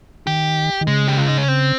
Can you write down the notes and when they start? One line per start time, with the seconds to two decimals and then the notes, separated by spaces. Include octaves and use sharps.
0.27 D#3 G4
0.81 D#3
0.87 C#3 G#3
1.08 G4
1.18 F4
1.28 D#4
1.37 C#4
1.48 C4